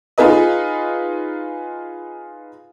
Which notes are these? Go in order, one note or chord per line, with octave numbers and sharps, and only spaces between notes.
D#4 F4 G#4 B4 D#5